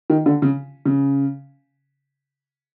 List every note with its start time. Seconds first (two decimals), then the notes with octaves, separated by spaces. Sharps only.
0.10 D#3
0.26 D3
0.42 C#3
0.85 C#3